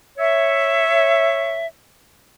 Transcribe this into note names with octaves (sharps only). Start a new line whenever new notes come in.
C#5 E5